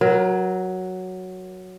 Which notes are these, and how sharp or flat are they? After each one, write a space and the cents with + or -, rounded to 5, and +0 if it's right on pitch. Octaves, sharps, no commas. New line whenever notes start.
F#3 +0 A#4 +30